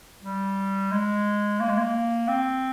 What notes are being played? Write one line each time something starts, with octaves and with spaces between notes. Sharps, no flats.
G3
G#3
A#3
G#3
A#3
C4